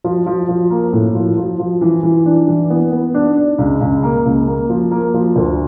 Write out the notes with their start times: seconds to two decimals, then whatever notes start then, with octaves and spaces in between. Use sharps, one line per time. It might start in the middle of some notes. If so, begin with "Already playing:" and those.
0.04 F3
0.26 F3
0.49 F3
0.70 A#3
0.93 A2
1.15 F3
1.37 F3
1.59 F3
1.81 E3
2.03 E3
2.26 D4
2.48 E3
2.70 B3
2.92 B3
3.14 D4
3.37 D4
3.58 C#2
3.81 C#2
4.03 A#3
4.25 C#2
4.47 A#3
4.70 F3
4.91 A#3
5.14 F3
5.36 D2